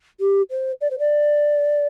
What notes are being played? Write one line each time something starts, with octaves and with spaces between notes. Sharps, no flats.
G4
C5
D5
C5
D5